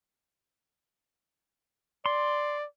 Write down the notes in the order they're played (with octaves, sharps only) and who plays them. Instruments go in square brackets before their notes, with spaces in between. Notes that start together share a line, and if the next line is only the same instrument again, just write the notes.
[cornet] D5 [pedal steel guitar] C6